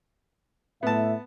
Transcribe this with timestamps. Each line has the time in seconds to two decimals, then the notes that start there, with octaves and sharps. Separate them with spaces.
0.83 A2 B3 E5 A5